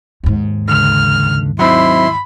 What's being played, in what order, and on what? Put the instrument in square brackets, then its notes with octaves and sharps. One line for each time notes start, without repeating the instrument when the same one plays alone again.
[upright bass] D#2 G#2
[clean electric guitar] C#2 D3 [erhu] F6
[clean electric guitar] F#3 C4 D#4 [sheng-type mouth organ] E4 C6 [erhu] B5